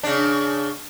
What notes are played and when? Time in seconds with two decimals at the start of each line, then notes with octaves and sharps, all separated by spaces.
0.03 C#3 D4